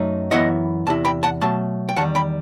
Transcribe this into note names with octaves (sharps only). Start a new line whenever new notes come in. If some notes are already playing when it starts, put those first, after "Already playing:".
Already playing: F#2 F#3 A3 D#4
F#2 E3 B3 E4 D#5 F#5
E2 C3 E4 A5
G5 B5
F#5 A5
B2 F#3 A3 A5
G5
E2 D#3 G3 F#5 A5
G5 B5